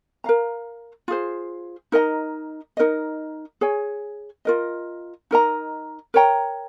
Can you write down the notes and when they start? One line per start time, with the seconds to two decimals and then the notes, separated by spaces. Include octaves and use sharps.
0.24 A#4 F5 A#5
1.08 F4 G#4 C5
1.92 D#4 A#4 D#5 A#5
2.77 D#4 A#4 D#5
3.61 G#4 C#5 G#5
4.45 F4 A#4 D#5
5.31 D#4 A#4 D#5 A#5
6.14 A#4 C#5 G5 A#5